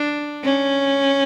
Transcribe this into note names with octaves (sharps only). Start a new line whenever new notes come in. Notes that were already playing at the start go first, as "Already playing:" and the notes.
Already playing: D4
C#4